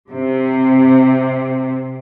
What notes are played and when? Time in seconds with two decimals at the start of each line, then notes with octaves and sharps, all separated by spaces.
0.11 C3